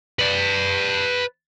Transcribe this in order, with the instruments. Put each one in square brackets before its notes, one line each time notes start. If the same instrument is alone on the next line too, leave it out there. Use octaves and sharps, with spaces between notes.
[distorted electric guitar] B4 D5